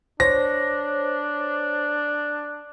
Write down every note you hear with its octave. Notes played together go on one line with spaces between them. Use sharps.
D4 C5 C#5 A#6